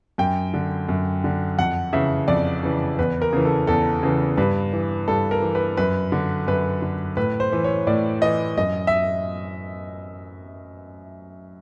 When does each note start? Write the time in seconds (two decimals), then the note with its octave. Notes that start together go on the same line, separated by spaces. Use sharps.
0.18 F#2 G5
0.54 D3
0.89 F#2
1.24 D3
1.59 F2 F#5
1.93 C#3 E3 E5
2.28 F2 D5
2.63 C#3 E3
2.99 E2 B4
3.22 A#4
3.33 C#3 E3
3.45 A4
3.67 E2 A4
4.03 C#3 E3
4.38 G2 B4
4.73 E3
5.08 G2 A4
5.31 A#4
5.42 E3
5.55 B4
5.77 F#2 B4
6.12 D3
6.48 F#2 B4
6.82 D3
7.17 A2 B4
7.40 C5
7.52 E3
7.64 C#5
7.87 A2 D5
8.22 E3 D#5
8.58 F#2 D#5
8.87 E5